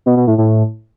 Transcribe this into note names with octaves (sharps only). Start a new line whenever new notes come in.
B2
B2
A2
A2